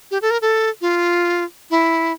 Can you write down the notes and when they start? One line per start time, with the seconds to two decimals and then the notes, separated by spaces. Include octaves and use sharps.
0.11 G4
0.22 A4
0.31 A#4
0.42 A4
0.81 F4
1.71 E4